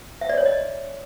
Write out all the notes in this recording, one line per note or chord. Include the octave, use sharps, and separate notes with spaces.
E5
D5
C#5
D#5